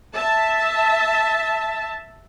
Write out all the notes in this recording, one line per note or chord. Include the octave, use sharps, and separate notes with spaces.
E5 A5